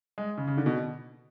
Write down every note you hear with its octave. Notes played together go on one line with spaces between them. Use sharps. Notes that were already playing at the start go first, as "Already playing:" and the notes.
G#3
C#3
C#3
D3
B2